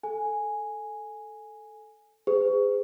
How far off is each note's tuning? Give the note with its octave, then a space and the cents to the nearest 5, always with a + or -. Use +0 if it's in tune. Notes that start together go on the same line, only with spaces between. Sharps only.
A4 +0 G#5 +0
G#4 -20 C5 -45